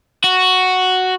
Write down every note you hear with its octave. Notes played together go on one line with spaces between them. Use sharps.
F#4